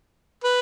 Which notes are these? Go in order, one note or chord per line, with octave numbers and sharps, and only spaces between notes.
B4